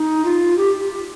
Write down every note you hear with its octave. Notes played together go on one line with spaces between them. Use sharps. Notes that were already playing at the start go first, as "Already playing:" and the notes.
Already playing: D#4
F4
G4